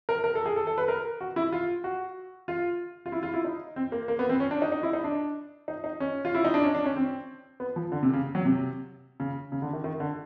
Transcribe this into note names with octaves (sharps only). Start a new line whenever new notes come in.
A#4
A#4
A4
G#4
A4
A4
B4
A#4
F#4
E4
F4
F#4
F4
F4
E4
F4
E4
D#4
C4
A#3
A#3
B3
C4
C#4
D4
D#4
D#4
E4
D#4
D4
D#4
D#4
C#4
F4
E4
D#4
D4
C#4
D4
C#4
C4
B3
F3
D3
C3
C#3
F#3
C3
C#3
C#3
D3
D#3
D#3
D3